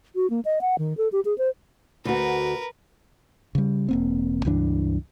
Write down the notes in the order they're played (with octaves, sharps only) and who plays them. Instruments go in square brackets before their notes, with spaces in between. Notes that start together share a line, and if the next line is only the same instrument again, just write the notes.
[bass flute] F#4
A#3
D#5
F#5
D#3
A4
G4
G#4
C5
[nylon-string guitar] D2 F#4 [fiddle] A#4 B4
[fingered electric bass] C#3 G3
E1 A#3 C4
C#2 G2 E3 D4